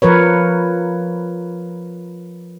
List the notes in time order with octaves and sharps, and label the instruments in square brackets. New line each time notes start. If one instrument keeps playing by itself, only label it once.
[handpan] F3 A#4 B4 C#5